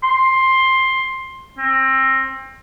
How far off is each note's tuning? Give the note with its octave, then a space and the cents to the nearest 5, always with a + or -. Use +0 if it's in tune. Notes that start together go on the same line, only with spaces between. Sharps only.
C6 +10
C4 +25